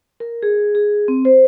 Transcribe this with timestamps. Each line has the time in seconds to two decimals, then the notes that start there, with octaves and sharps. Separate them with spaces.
0.20 A#4
0.43 G#4
0.75 G#4
1.08 C4
1.25 C5